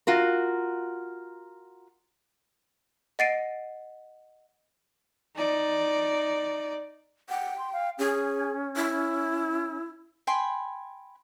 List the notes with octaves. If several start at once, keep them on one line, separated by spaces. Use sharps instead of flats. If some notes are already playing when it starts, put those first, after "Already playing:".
F4 F#4 A#4
D#5 F#5 A6 C7 D7 D#7
D#4 D5
F#5 G5
C6
F5
C#4 G#4
E4
G5 G#5 B5 C6